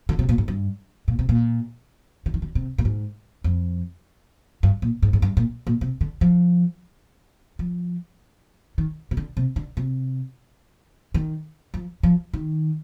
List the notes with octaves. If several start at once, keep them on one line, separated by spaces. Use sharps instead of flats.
D3
C3
A#2
G#2
G2
A#2
C3
A#2
D3
D#3
D3
C3
A#2
G#2
F2
G2
A#2
G#2
G#2
G2
A#2
A#2
C3
D3
F3
F3
D#3
C3
D3
C3
D3
C3
D#3
F3
F3
D#3